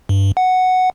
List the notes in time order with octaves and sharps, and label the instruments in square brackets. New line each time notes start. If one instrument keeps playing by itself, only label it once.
[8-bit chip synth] G2
F#5